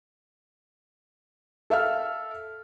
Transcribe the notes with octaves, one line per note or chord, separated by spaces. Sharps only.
A4 E5 F5 F6